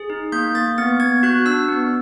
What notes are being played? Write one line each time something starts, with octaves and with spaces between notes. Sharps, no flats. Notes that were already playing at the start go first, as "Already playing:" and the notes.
Already playing: G#4
D#4
A#3 G6
A#3 A6
B3 A6
B3 G#6
F#4 F#6
D4 E6
B3